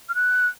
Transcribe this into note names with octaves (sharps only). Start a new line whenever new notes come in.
F6
F#6